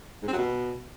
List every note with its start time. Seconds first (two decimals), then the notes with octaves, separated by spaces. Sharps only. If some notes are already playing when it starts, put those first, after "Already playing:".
0.23 G#2
0.28 C4
0.33 F#3
0.38 B2